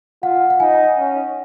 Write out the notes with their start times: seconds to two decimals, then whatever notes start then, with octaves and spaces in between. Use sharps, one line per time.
0.23 F4 F#5
0.50 F#5
0.60 D#4 G#5
0.98 C#4